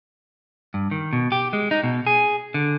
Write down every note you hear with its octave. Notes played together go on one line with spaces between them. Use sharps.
G2
D#3
B2
G4
G#3
D#4
B2
G#4
D3